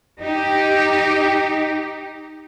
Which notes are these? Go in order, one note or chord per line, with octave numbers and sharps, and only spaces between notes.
D#4 G4